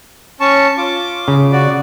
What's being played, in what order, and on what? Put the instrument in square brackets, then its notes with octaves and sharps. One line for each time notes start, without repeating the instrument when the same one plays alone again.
[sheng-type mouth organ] C#4 A5 C#6
F4 D6
[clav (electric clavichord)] C#3
[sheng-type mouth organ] F#4 D5